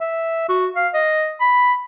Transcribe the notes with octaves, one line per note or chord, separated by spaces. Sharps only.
E5
F#4
F5
D#5
B5